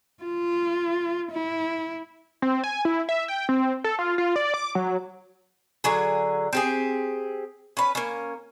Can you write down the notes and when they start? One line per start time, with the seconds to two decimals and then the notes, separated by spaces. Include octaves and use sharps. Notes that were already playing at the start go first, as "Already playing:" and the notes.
0.23 F4
1.32 E4
2.42 C4
2.64 G#5
2.85 E4
3.09 E5
3.28 G5
3.49 C4
3.84 A4
3.99 F4
4.18 F4
4.36 D5
4.54 D6
4.75 F#3
5.84 D3 F#3 G#4
6.53 C4 G4 G#4
7.77 C#4 B4
7.95 A#3 C#4